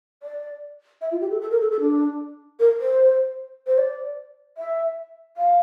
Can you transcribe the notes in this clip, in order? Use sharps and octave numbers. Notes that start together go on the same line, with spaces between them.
D5
E5
F4
G4
A4
A4
A#4
A4
A4
D4
A#4
C5
C5
D5
E5
F5